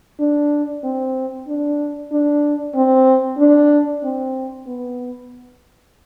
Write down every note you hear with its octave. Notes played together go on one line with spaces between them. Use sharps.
D4
C4
D4
D4
C4
D4
C4
B3